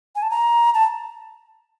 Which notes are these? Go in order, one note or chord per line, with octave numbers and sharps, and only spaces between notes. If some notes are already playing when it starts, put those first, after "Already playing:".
G#5
A5
A#5
A5